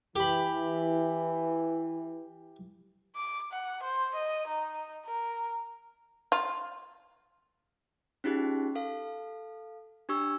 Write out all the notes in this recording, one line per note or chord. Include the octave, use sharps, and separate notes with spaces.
E3 G4 B5
D6
F#5
C5
D#5
D#4
A#4
F4
C#4 D#4 F4 G4 G#4
A4 F5
D4 G4 C#6 E6